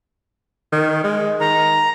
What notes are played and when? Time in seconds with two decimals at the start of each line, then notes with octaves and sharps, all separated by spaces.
0.72 D#3
1.04 G#3
1.41 D#3 A#5